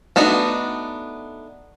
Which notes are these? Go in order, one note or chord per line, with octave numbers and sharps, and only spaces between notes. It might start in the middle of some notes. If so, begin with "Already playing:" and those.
A3 B3 D4 D#4 F#4